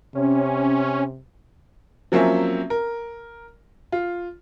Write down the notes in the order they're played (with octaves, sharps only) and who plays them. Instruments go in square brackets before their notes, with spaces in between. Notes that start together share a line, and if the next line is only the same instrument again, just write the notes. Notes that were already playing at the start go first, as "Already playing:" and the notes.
[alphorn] C3 [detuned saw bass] C#4
[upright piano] F3 F#3 A#3 C4 C#4 E5
A#4
F4